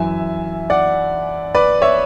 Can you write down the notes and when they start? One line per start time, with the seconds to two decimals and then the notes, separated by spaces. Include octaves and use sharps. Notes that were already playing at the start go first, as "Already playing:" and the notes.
Already playing: F#2 E3 E5 G#5
0.70 D5 F#5
1.55 B4 D5
1.82 C#5 E5